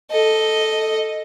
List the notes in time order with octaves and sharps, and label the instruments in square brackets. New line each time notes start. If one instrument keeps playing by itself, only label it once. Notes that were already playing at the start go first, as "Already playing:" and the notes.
[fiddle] A4 D#5